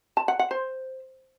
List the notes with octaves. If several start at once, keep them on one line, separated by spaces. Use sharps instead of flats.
A5
F#5
F#5
C5